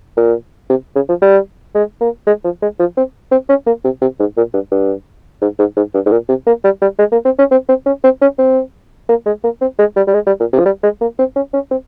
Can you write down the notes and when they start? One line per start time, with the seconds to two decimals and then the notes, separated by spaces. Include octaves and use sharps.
0.17 A#2
0.70 C3
0.96 C#3
1.09 F3
1.22 G3
1.75 G#3
2.00 A#3
2.27 G#3
2.44 F3
2.62 G#3
2.79 F3
2.97 C4
3.31 C4
3.49 C#4
3.67 A#3
3.84 C3
4.02 C3
4.20 G#2
4.37 A#2
4.54 G2
4.72 G2
5.42 G#2
5.59 G#2
5.77 G#2
5.94 G2
6.06 G#2
6.11 A#2
6.29 C3
6.47 A#3
6.64 G3
6.82 G3
6.99 G#3
7.12 A#3
7.25 C4
7.39 C#4
7.51 C4
7.69 C4
7.86 C#4
8.04 C4
8.21 C#4
8.39 C4
9.09 A#3
9.26 G#3
9.44 A#3
9.61 C4
9.79 G#3
9.96 G3
10.07 G3
10.14 G#3
10.27 G3
10.40 A#2
10.53 C3
10.59 F3
10.65 G3
10.83 G#3
11.01 A#3
11.19 C4
11.36 C#4
11.54 C#4
11.71 C4